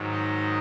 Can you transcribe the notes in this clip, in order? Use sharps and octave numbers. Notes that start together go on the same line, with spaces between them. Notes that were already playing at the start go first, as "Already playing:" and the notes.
Already playing: G#2 D#3 F#3
D#5